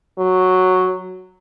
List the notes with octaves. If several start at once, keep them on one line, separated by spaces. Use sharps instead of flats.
F#3